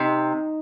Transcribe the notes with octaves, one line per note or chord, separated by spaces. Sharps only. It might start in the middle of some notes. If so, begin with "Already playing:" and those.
Already playing: C3 D#4